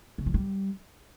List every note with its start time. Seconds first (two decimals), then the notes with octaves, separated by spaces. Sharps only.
0.18 C#3
0.26 F3
0.34 G3